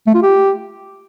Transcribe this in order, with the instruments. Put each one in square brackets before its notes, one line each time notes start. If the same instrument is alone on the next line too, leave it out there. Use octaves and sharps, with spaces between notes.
[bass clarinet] A3
F4
G4